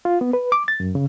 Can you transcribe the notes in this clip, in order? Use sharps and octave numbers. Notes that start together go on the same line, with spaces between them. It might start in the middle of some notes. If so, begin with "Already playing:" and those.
F4
B3
B4
D6
A6
F#2
C#3